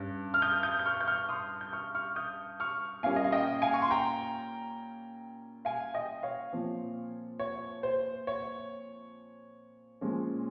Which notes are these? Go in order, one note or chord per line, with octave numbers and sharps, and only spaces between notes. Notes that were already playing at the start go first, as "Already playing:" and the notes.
Already playing: G2 C#4
F6
D#6 G6
D#6 G6
G6
C#6 F6
G6
C#6 F6
C6 D#6
G6
C#6 F6
C#6 F6
D#6 G6
C#6 F6
A#2 G3 A#3 C#4 F5 G#5
D#5
F5
D#5 G5
F5 G#5
C#6
C6
G5 A#5
F5 G#5
D#5 G5
C#5 F5
A#2 F3 C4
C#5
C5
C#5
A#2 F3 G#3 C#4